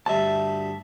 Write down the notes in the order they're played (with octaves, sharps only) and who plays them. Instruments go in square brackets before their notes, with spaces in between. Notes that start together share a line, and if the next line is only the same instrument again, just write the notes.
[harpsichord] D2 G2 [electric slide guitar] E5 A5